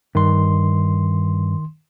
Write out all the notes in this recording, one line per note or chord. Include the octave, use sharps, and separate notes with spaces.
G2 D#3 C6